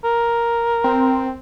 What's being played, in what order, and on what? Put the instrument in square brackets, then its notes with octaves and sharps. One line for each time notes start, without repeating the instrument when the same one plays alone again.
[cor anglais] A#4
[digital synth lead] C4